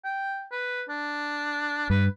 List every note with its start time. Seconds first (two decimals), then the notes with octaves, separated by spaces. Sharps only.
0.05 G5
0.52 B4
0.89 D4
1.90 G2 B4